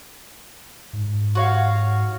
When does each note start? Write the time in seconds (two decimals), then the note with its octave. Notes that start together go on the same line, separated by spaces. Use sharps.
0.93 G#2
1.35 F#4 C#5 F5